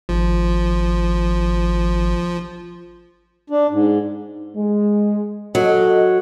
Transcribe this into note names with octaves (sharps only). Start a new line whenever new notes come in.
G#1 F3
D4
G#2
G#3
F#3 A4 D#5